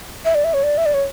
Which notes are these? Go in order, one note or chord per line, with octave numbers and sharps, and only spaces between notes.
E5
D5
E5
C#5
D5
E5
D5
C#5